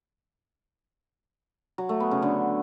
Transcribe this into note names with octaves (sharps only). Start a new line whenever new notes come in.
F#3
A3
B3
C#3
D3